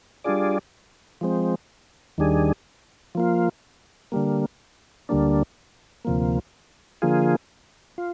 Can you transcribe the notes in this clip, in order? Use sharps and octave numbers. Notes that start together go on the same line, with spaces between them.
G3 D4 F4 G#4 D5
F3 G#3 C4
D#2 D#3 G3 D4 G#4
F3 A#3 F4
D3 G3 A#3
D2 D3 G3 A#3 D4
D2 C3 F3 A#3
D3 F3 A#3 F4 G#4
F4